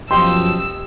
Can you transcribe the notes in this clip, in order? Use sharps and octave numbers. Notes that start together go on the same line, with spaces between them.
F#2 B2 F3 G4 D#5 G5 C6 E6